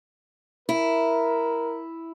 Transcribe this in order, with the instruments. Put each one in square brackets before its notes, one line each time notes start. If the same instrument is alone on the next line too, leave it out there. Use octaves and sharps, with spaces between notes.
[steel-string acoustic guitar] E4 [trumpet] A#4